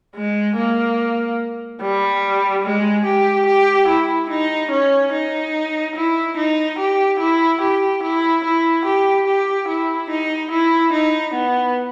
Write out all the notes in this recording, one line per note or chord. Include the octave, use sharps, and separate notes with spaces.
G#3
A#3
G3
G#3
G4
G4
E4
D#4
C#4
D#4
E4
D#4
G4
E4
G4
E4
E4
G4
G4
E4
D#4
E4
D#4
B3